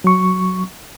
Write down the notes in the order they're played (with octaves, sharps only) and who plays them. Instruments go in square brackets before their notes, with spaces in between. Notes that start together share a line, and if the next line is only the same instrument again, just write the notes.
[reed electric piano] F#3 C#6